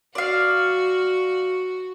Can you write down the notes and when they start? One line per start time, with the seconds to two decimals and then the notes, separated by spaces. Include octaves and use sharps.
0.15 F#4 D5 F5